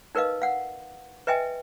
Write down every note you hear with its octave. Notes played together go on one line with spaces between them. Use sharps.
D#4 A#4 B4 D#5 F5
F5 F#5
B4 D#5 E5 G5 G#5